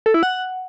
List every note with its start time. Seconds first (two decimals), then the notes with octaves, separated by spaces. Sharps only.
0.06 A4
0.14 E4
0.23 F#5